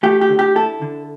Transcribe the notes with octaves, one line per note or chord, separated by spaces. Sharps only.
A3 G4
G4
D3
G4
E4 A4
D3